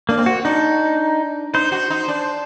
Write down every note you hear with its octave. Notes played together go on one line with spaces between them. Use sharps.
A#3 D4
C4
F#4
D4 D#4
D#4 C5
F#4
D#4
D4